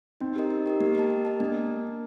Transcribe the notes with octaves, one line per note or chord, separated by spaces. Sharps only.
C4 D#4
G4 A#4 D#5
D#4
G4 A#4 D#5
A#3 G4
A#4 D#5 A5
G4
A#4 D#5 A5
A#3 D4